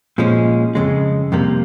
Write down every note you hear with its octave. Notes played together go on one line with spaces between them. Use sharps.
A#2 F3 G#3 C#4
F2 C#3 G#3
F2 C3 G3 A#3